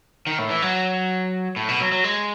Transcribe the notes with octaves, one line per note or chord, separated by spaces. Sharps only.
D#3
A2
E3
F#3
A2
B2
F#3
F#3
G#3